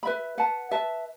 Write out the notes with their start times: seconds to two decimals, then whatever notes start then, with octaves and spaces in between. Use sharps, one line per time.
0.03 B4 E5 B5
0.38 B4 F#5 A5
0.71 B4 E5 A5